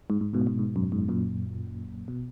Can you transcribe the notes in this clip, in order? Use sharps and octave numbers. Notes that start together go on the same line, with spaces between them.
G#2
G#2
G#2 B2
G#2
G#2
F#2
G#2
F#2 A#2
B2